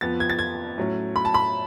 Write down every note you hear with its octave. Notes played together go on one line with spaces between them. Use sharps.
F2 F3 B3 A6
G#6
A6
G#6
A2 F#3 C#4
B5
A5
B5